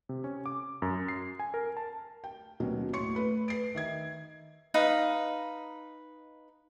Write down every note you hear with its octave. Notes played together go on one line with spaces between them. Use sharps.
C3
C#4
D6
F#2
C7
G#5
A#4
A5
G5
D#2 B2 F#3 C#4
A2 C#5 C6 C#6 C#7
A3 B4 B5
B4 C7 D7
D#3 E5 G#6
D#4 B4 F5